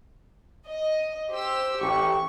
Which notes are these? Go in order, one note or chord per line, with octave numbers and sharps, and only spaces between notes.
D#5
G4 C5 E6
A1 G4 C#6